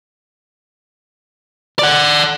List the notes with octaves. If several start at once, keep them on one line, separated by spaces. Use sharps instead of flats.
D5 F#5